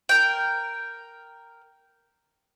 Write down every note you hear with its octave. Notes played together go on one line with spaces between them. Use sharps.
A#4 G5